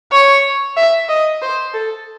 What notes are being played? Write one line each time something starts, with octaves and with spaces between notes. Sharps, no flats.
C#5
E5
D#5
C5
A4